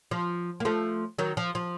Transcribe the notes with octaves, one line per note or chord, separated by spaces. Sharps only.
F3
A#3
F3 A3
D#3 F#3
F3
F3